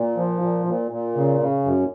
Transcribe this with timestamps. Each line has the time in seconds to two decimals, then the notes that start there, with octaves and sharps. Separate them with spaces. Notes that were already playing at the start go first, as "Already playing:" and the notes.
Already playing: A#2
0.17 F3
0.42 A#2
0.66 A#2
0.91 A#2
1.16 C#3
1.40 C#3
1.65 F#2